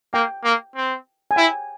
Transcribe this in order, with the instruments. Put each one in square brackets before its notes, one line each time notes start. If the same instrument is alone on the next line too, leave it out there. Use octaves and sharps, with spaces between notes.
[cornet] A#3 [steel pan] G5
[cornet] A#3
C4
[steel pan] G#5
[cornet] E4 [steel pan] G5